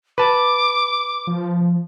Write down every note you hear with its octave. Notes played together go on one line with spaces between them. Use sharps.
B4 A5 D6
F3